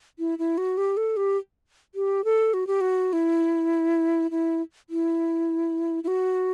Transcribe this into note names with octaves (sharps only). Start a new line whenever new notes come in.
E4
E4
F#4
G4
A4
G4
G4
A4
F#4
G4
F#4
E4
E4
E4
E4
F#4